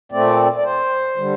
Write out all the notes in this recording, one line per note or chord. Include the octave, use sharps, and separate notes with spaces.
A#2 A3 C4 D5
D5
C5
D3 G3